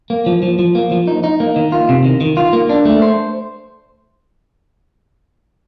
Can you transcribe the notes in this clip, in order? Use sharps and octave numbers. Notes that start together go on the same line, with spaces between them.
A#3
F3
F3
F3
A#3
F3
D#4
D#4
A#3
D#3
F4
C3
D#3
D#3
F4
A#3
D4
A3
C5